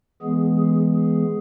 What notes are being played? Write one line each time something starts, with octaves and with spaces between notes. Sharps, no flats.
E3 G#3 B3 G#4
G#4
G#4